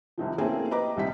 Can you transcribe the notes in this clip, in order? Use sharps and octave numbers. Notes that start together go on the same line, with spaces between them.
C2 C3 D#3 F3
A3 A#3 C4 C#4 E4 G#4
G4 B4 D#5 A#5 D6
D#1 C2 C3 G3 D#4 B6